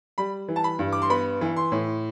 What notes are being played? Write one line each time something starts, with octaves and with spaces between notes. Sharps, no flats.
G3 B5
E3
A5
B5
G2
D6
C6
B3 B5
E3
C6
A2